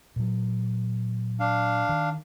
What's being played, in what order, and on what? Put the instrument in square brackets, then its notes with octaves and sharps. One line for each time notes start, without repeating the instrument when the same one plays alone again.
[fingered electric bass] A#2 F#3
[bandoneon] D4 F5
[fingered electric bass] D#3